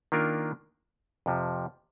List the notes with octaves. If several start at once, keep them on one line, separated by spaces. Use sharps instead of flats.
D#3 A#3 D4 F4 A#4
F2 C3 F3